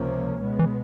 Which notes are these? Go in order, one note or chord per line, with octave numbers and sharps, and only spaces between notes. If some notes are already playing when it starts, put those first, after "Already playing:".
Already playing: C#2 C3 F3 A#3 C#4
B2 G#3 B3
E3